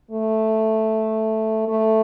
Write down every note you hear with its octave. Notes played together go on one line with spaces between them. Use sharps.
A3
A3